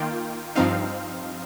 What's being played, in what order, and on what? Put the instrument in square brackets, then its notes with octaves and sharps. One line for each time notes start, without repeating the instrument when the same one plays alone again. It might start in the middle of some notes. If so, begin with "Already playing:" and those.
Already playing: [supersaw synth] D#3 A#3 F4 G5
G2 F3 C4 D#4 F5